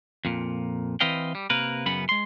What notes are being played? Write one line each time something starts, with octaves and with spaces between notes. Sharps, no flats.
F2 A#2
E3 C4 B4 D#5 F5 G5
G3
C3 A#3 A#4 B4
F#2 C#3 B3 B5
G#3 C6